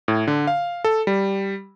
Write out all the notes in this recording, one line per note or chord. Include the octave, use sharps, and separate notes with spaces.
A2
D3
F5
A4
G3